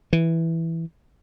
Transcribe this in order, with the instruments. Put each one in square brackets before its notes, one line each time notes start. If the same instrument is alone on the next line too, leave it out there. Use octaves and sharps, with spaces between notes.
[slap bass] E3